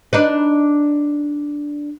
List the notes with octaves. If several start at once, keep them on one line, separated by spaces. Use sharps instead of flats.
D4 D#4 B4